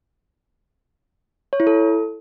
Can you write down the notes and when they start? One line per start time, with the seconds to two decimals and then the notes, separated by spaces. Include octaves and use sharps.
1.53 C#5
1.60 E4
1.67 A4